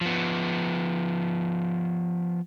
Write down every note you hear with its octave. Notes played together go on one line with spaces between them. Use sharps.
F3 B3